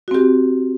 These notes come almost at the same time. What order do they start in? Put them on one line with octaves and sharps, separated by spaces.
F#4 C4 G4